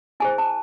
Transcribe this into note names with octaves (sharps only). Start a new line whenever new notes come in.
E4 G#4 C5 G#5
A5